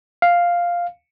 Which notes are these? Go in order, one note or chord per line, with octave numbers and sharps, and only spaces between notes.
F5